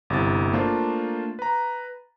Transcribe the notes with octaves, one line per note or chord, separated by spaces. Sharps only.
G1 C3 E4 A6
A3 A#3 D4 F4 C5
B4 A#5